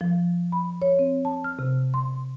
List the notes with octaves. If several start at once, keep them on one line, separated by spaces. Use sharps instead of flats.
F3
B5
C#5
C4
A5
F6
C3
C6